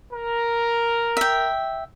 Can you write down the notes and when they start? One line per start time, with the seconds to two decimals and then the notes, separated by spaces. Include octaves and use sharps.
0.12 A#4
1.17 E5 G5